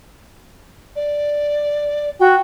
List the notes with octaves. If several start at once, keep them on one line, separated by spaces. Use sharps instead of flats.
D5
F#4 G5